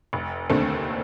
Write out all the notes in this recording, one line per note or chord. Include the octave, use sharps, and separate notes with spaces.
F1
D#2 D3 A3 C4